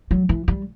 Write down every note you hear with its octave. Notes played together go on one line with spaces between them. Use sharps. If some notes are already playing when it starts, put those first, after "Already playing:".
F#3
E3
G3